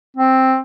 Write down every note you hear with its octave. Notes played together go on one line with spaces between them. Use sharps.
C4